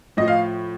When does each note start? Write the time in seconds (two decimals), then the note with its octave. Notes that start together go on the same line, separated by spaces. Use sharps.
0.17 A2 F3 D#5
0.28 F5